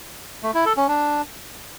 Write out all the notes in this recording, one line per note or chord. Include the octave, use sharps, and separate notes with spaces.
A3
E4
A4
C#4
D4